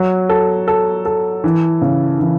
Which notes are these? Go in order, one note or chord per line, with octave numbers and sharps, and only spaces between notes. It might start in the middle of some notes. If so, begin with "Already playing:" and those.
Already playing: F#3
A4
A4
A4
E3
C#3
E3